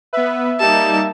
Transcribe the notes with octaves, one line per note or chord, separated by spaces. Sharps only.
B3 B4 E5
G3 A#3 D#4 A5